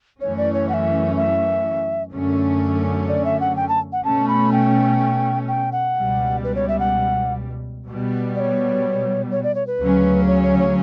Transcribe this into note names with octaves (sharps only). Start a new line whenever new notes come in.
F#2 E3 A3 C#4 C#5
D5
C#5
F#5
E5
E5
F#2 D3 A3 C#4
D5
E5
F#5
G5
A5
F#5
B2 A3 C#4 A5
B5
G5
G5
F#5
C#2 B2 G3
B4
C#5
E5
F#5
B2 G3 B3
D5
C#5
C#5
D5
C#5
B4
D2 C#3 F#3 C#4
C#5
C#5
C#5